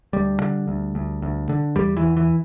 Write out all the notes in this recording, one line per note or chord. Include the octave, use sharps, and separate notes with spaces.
D2 G3
D3
D2
D2
D2
D3
E2 G3
E3
E2
E3